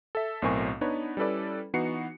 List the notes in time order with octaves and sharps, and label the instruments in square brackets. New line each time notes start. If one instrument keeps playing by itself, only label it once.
[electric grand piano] A4 E5
B1 A2 C4 A#4 G#5 C#6
B3 D4 D#4 B4 C#5
G3 C#4 E4 A4 B4 D5
E3 B3 D#4 F#4 C7 C#7